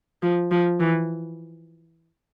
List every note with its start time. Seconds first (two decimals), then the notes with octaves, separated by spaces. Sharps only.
0.23 F3
0.51 F3
0.80 E3